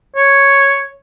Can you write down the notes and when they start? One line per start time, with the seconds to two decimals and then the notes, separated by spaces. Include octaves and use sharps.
0.16 C#5